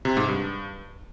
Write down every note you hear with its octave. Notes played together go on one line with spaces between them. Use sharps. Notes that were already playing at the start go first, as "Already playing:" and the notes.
C3
G#2
G2